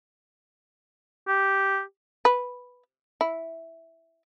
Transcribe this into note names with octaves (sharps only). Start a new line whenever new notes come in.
G4
B4
E4